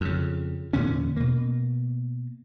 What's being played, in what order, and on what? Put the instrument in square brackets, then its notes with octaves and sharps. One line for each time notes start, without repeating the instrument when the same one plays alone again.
[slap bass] F2 C#3
E2 A#2 D3 C#4
B2 A#3